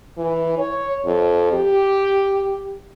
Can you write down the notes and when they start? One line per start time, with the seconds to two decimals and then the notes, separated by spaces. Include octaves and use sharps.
0.17 E3
0.58 C#5
1.05 F2
1.53 G4